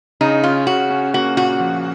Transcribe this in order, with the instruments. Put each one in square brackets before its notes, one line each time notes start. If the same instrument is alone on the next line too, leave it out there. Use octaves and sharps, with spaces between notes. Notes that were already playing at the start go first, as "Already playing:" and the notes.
[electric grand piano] C#3 [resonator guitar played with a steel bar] D#4
[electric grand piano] C#4 [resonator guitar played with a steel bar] F4
[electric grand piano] C#3 [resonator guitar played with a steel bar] F#4
[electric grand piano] C#4
[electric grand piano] A#3 [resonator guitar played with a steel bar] F#4
[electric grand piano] A#2 [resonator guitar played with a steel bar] F#4
[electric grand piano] F3